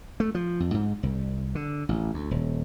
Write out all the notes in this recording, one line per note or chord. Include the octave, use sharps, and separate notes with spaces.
A3
F3
F2
G#2
C2
D3
A1
D2
D#1